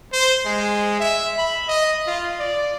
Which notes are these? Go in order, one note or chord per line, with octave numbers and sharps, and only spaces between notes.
C5
G#3
E5
B5
D#5
F4
D5